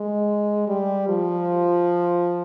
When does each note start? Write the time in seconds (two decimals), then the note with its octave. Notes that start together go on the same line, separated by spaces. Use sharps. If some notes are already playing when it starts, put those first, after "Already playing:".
Already playing: G#3
0.68 G3
1.09 F3